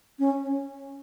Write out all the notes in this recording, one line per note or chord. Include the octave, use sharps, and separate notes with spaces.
C#4